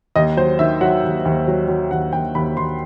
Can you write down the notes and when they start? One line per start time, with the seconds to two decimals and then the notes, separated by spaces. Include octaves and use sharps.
0.16 D#2 D#5
0.37 F#3 C5
0.59 D#3 E5
0.81 F#3 F#5
1.04 D#2
1.25 D#2
1.48 F#3
1.68 F#3
1.91 D#2 F#5
2.13 D#2 G5
2.35 D#2 B5
2.57 D#2 C6